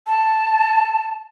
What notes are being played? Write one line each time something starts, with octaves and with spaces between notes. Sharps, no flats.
A5